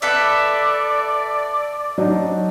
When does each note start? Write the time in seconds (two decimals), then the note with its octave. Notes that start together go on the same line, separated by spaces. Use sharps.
0.02 A4 B4 D5 E5
1.98 F#3 D4 D#4